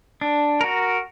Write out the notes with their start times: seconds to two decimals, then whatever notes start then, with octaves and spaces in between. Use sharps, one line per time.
0.21 D4
0.61 F#4 A#4